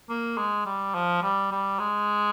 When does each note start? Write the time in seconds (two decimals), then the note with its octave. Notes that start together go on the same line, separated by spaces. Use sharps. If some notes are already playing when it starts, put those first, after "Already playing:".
0.09 A#3
0.38 G#3
0.66 G3
0.95 F3
1.22 G3
1.52 G3
1.79 G#3